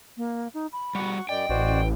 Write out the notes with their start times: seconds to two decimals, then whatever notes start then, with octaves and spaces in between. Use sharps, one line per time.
0.17 A#3
0.54 D#4
0.72 B5
0.95 G3 F#4 F#5 C#6
1.29 F#2 D5 D#5 G5
1.49 A1 F#4 C5 D5